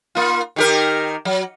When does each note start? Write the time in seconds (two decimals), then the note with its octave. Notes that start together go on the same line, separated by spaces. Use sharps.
0.15 A#3 F4
0.56 D#3 G4 A#4
1.25 F#3